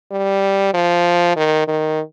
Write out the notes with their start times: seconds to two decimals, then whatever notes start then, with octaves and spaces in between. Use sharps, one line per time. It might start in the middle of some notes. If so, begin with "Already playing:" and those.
0.11 G3
0.74 F3
1.36 D#3
1.68 D#3